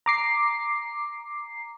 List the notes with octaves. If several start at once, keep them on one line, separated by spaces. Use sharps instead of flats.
A#5 D6 C7